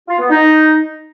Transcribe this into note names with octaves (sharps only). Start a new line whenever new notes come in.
F4
B3
D#4